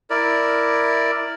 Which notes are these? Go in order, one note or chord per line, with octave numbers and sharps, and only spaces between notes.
E4 A#4 D5